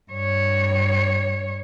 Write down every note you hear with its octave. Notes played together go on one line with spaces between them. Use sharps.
G2 C#5